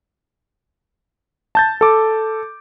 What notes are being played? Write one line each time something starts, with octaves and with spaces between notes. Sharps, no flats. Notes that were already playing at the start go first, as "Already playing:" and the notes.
A5 G6 A6
A4 D6